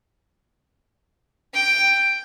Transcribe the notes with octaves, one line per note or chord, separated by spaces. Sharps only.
G5